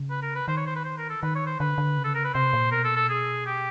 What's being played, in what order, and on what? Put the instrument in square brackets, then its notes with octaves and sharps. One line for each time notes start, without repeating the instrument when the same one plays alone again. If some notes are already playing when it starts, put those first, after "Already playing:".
Already playing: [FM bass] C#3
[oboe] B4
A#4
B4
[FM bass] D#3 [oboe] C5
[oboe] C#5
C5
B4
C5
A#4
A4
[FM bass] D#3 [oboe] B4
[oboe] C#5
C5
[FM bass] D3 [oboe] B4
[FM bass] D3
C#3
[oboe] A4
A#4
B4
[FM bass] C3 [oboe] C5
[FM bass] A#2
[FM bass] B2 [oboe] A#4
[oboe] A4
A4
G#4
G4